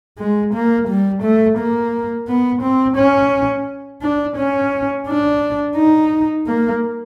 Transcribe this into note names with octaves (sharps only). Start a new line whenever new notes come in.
G#3
A#3
G3
A3
A#3
B3
C4
C#4
D4
C#4
D4
D#4
A#3